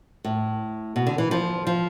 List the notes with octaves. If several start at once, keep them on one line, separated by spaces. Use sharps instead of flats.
A2
B2
D3
E3
F3
F3